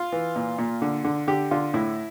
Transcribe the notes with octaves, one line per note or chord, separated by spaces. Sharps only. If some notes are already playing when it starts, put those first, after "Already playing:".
Already playing: F4
E3
A#2
A#2
D3
D3
D3 G4
D3 F4
A2 E4